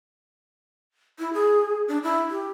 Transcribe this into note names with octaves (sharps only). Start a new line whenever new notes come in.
E4
G#4
D4
E4
G4